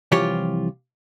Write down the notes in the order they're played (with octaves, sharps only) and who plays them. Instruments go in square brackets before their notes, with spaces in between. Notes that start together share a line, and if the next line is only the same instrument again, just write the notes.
[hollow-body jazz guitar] C2 E3 F3 F4 G4 C#5